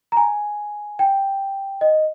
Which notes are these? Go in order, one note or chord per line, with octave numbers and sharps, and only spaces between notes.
A#5
G#5
G5
D#5